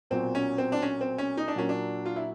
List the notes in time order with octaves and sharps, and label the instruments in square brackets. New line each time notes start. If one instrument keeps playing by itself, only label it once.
[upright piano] B1 A#2 F#3 [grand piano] C4
[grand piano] C#4
C4
D4
C#4
C4
C#4
D#4
D4
[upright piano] A#2 F#3 A#3 [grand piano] C#4
[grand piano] D4
F4
E4